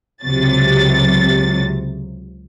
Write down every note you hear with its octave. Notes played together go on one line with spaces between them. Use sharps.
C#2 C3 F#3 A6